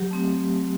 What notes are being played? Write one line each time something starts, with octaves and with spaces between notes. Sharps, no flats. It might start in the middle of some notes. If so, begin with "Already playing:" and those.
Already playing: F#3 G4
A3 C4